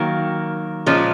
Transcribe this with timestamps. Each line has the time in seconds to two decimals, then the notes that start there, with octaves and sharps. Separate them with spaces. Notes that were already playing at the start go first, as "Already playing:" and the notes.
Already playing: D#3 F#3 A#3
0.86 A#2 F3 G#3 C#4